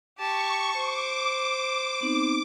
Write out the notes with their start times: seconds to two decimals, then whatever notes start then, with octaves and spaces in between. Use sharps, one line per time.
0.19 G4 A5 C#6
0.77 C5 D6
2.01 B3 C4 D#4